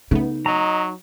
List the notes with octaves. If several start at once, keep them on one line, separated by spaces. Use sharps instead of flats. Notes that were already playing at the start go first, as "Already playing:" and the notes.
C#3 A3 B3 D#4
F#3 D#5 A#5